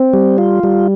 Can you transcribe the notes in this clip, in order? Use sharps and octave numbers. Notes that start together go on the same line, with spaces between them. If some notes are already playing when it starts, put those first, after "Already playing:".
Already playing: C4
G3
F4
G3